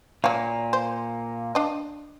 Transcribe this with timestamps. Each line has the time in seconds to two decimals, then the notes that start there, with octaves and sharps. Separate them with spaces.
0.24 A#2 F#3 A#3 F5
0.73 C5
1.55 D4 D#5